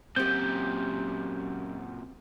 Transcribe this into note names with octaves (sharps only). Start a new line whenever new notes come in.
F#2 A#2 C4 G4 G6